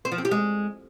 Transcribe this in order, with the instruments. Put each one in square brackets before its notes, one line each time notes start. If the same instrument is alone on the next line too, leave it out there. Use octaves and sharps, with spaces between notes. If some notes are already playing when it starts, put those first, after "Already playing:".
[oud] C4
F3
C4
G4
G#3